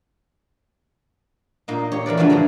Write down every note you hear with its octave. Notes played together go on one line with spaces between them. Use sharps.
A#2 A#3 D#4
G4 C#5
E2 A#4 B4 D5
C#3 F3 G3 A3 D4 F#4
G#2 E3 G3 A3 C5 A#5